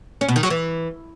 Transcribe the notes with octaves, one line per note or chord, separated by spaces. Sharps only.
C#4
B2
D#3
F#3
E3